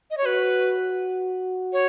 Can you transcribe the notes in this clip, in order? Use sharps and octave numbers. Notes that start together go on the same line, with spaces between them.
D#5
C#5
F#4 B4
C#5